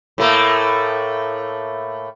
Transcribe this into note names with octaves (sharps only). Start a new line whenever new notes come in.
A2 A3 A#3